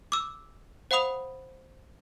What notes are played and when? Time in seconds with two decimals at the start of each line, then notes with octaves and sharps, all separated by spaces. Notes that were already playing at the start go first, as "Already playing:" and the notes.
0.12 D6 E6
0.91 C5 F5 F#5 B5 D#6 F7